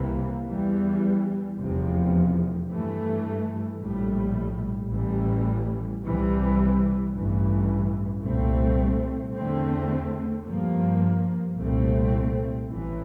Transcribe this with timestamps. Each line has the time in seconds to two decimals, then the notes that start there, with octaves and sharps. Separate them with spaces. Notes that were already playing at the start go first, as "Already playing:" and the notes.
Already playing: C2 C3 E3 A#3
0.49 E2 E3 G3
1.59 F1 E2 C3 F3
2.69 G2 E3 A3
3.81 A#1 A2 G3
4.91 A1 A2 E3 G3
6.03 C2 C3 E3 G3
7.13 A1 G2 E3
8.24 C2 A#2 A3 C4
9.35 E2 D3 A3 C4
10.47 G2 F3 A#3
11.57 C2 A#2 A3 C4
12.67 A1 A2 E3